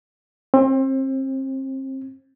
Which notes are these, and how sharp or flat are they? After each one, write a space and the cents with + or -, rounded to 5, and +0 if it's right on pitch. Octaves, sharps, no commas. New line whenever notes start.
C4 +30